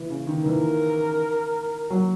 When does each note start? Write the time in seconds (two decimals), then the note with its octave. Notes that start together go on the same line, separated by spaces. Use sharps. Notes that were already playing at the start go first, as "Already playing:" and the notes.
Already playing: E3
0.10 C#3
0.27 D#3
0.45 E3 A#4
1.90 F#3